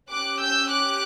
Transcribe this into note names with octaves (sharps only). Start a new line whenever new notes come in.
C#4 G4 D6 F#6
E6 G6
D6 F#6